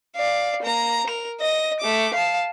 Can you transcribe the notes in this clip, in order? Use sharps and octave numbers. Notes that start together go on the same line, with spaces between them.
D5 F5
A#3 A#5
A#4 F7
D#5 A#6
A3 D6
F5 A5